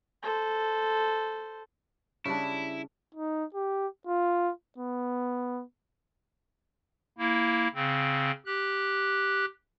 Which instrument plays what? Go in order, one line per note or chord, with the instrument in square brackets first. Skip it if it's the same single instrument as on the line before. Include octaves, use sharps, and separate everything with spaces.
[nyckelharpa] A4 C5
[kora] C#3 G3 D4 [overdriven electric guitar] E4
[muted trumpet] D#4
G4
F4
B3
[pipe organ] A#3 E4
C#3 C4
G4 F#6